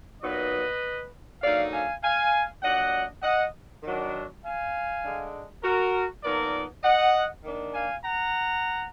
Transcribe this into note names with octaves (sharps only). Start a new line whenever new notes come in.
A#2 F#3 B3 D#4 B4 D#5
D3 F#3 A#3 D#4 D5 F5
F5 G#5
F5 G#5
A#2 F#3 D4 D#5 F#5
D#5 F#5
D#3 F#3 D4
F5 G#5
D3 G#3 D4
F#4 A#4
A#2 F3 B3 D#4 A#4 D5
D#5 F#5
D#3 A#3 D4
F5 G#5
F#5 A#5